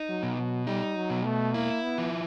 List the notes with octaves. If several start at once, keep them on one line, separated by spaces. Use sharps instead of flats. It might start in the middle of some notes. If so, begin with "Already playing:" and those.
Already playing: D#4
F#3
B2
F#3
G3 D#4
F#3
B2
A3
A#3 E4
B3
F3